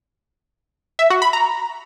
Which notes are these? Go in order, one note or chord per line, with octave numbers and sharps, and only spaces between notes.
E5
F#4
B5
A#5